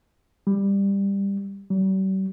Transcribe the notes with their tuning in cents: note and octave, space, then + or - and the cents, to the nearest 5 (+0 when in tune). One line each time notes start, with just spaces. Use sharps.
G3 +15
G3 -45